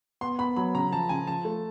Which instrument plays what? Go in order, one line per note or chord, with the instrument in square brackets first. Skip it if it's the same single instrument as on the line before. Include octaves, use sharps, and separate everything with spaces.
[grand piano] B3 [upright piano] C6
[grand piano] B3 [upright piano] B5
[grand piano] F#3 [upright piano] B5
[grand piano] C#3 [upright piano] A#5
[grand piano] F3 [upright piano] A5
[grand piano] C#3 [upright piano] G#5
[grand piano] F3 [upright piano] A5
[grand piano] A3